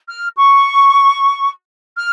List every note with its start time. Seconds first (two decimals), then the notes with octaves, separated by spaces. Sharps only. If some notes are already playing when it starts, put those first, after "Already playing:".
0.09 F6
0.36 C#6
1.96 F6